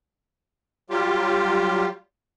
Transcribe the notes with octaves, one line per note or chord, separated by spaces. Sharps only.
F#3 G3 F4 G4